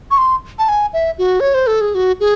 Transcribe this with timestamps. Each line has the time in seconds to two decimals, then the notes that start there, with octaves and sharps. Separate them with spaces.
0.11 C#6
0.18 C6
0.59 A5
0.69 G#5
0.93 E5
1.18 F#4
1.40 C#5
1.54 C5
1.67 A4
1.81 G#4
1.95 F#4
2.20 G#4